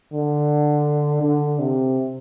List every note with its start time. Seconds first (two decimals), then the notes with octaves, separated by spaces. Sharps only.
0.13 D3
1.21 D3
1.59 C3